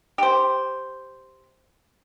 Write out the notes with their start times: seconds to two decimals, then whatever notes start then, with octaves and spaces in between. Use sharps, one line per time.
0.18 G4 C5